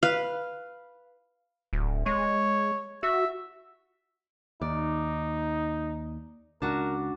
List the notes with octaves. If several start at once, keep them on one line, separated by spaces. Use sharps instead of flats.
B4 F5
D1
G#3 C#5
F#4 E5
D#2 D#4 D5
C#2 D4 F#4 A#4